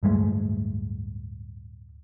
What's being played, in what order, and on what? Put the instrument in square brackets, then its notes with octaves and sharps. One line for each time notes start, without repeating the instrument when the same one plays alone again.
[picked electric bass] D1 G2 G#3 A3